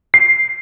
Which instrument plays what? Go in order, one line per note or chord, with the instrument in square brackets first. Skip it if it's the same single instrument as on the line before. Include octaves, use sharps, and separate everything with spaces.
[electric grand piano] C7